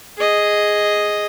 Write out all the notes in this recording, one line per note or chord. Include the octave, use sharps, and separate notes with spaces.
G#4 D#5